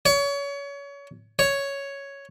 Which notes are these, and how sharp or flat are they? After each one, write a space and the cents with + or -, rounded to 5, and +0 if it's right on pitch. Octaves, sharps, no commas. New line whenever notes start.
C#5 +30
C#5 +5